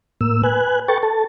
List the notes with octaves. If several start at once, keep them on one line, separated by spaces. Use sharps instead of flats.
A2 A#3 E6
B4 G#5 F#6
A4 B4 G5 C#6 A6
A4 A5